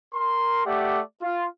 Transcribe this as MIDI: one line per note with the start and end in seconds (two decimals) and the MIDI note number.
0.15 0.64 70
0.15 0.64 84
0.65 1.01 57
0.65 1.01 67
0.65 1.01 74
0.65 1.01 76
0.65 1.01 78
1.22 1.46 65